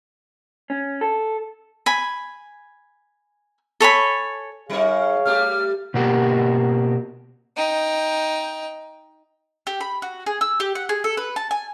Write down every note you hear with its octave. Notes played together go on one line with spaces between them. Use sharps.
C#4
A4
G#5 B5
A4 C#5 G#5 B5
F#3 D#4 G#4 A#4 C#5 F5
G3 A3 G4 F6
B2 A#3 F#4 G4
D#4 G5
G4
B5
F#4
G#4
E6
G4
F#5
G#4
A4
B4
A5
G#5